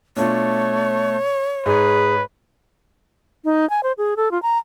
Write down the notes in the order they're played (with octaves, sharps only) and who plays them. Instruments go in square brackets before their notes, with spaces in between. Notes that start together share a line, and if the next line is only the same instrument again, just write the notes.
[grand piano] B2 D4 F4 [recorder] A3 [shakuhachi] C#5
[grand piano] G#2 [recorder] G#4 [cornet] B4
[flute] D#4
G#5
C5
G#4
A4
F4
A#5